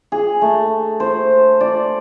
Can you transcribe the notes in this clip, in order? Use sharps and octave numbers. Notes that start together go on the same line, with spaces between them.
G#4
A3
C5
D5